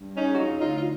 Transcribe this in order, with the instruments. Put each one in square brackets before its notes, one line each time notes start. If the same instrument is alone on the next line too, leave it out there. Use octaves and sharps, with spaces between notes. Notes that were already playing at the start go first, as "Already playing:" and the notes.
Already playing: [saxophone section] G2
C#3 C#4 D#4
F#4
F#3 D#4 F4
D2 D#4 F4
F4